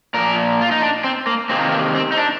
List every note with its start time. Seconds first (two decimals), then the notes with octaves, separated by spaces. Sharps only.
0.14 A#2 F3 A#3 A#4
0.61 F4
0.71 D#4
0.82 D4
1.04 C4
1.27 A#3
1.49 C3 D#3 A#3 C4
1.72 A#3
1.95 C4
2.12 D#4
2.17 D4